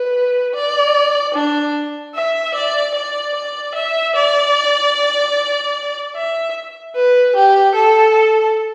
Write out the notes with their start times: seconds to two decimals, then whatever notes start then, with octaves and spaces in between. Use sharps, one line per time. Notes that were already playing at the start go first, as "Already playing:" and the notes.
Already playing: B4
0.54 D5
1.34 D4
2.15 E5
2.54 D5
2.94 D5
3.34 D5
3.75 E5
4.15 D5
6.15 E5
6.96 B4
7.36 G4
7.75 A4